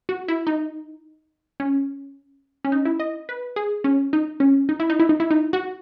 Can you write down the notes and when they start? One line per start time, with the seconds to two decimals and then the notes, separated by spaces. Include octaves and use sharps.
0.09 F#4
0.28 E4
0.47 D#4
1.60 C#4
2.65 C#4
2.72 D#4
2.85 E4
3.00 D#5
3.29 B4
3.56 G#4
3.84 C#4
4.13 D#4
4.40 C#4
4.69 D#4
4.80 E4
4.90 D#4
5.00 E4
5.09 D#4
5.20 E4
5.31 D#4
5.53 F#4